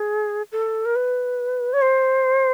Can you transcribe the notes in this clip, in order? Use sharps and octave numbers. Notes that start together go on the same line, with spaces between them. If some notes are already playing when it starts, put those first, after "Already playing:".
Already playing: G#4
A4
A#4
B4
C#5
C5